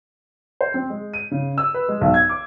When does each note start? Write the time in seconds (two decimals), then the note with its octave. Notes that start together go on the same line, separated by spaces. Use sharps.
0.61 C5
0.74 C4
0.90 G#3
1.14 D#7
1.32 C#3
1.58 E6
1.74 B4
1.88 G#3
2.01 B1
2.14 G#6
2.29 D6